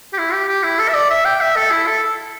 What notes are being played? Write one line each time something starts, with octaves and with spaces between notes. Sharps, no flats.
G4
E4
G4
G4
E4
A4
E5
D5
E5
G5
E5
A4
E4
A4